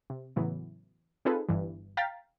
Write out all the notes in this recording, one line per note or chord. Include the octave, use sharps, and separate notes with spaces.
C3
A2 C#3 E3 F#3 B3
C4 D#4 F4 G#4 A4 B4
G1 G2 E3
F5 G5 A#5 A6 B6